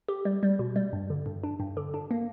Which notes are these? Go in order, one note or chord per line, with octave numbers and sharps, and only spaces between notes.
G4
G3
G3
B2
G3
G2
D3
G2
D4
G2
D3
D4
A#3